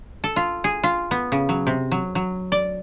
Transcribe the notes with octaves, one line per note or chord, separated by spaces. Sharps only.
A4
F4
G#4
F4
B3
C#3
F#3
C3
F#3
F#3
D5